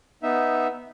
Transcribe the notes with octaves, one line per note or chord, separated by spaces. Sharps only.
B3 D#4 E5